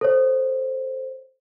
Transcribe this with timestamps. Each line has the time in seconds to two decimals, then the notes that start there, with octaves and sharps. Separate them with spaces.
0.01 A4 C5 C#5